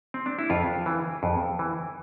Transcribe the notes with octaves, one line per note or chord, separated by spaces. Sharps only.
C4
D4
E4
F2 F4
E3
F2
E3